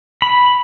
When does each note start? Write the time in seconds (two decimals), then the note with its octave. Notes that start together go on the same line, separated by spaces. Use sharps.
0.22 B5